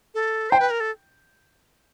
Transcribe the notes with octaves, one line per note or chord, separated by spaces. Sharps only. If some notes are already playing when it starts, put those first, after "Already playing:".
A4
C5 G5
B4
A#4
A4